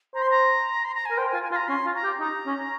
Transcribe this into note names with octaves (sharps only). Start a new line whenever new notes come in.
C5 A#5
C6
A#5
C6
A#5
G#5
A#4
C5 G5
F4 G#5
G#5
F4 C6
A#5
C#4 C6
F4
A#5
G4
D#4 A#5
C#4